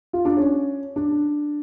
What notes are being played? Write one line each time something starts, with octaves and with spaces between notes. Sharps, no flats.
F4
D4
C#4
D4